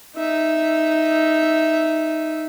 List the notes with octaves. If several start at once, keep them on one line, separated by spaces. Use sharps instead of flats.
D#4 E5